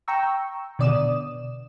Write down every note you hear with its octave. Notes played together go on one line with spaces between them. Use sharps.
G5 A#5 C#6 E6
B2 D3 D5 D#6 E7